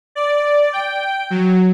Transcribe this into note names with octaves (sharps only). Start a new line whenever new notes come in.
D5
G5
F#3